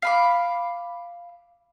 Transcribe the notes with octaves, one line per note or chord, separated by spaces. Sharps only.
F5 B5 D6